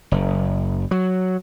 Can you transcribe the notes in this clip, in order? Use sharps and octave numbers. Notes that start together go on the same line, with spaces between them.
F#1
F#3